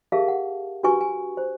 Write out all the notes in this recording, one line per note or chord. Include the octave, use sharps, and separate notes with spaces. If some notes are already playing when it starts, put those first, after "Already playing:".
G4 G#4 A#4 E5 F5 A5
F#5
D4 F#4 G4 B4 G#5 C#6
G#5
C5